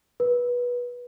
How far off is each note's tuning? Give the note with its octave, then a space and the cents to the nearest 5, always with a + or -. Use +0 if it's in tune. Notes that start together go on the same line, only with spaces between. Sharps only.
B4 -20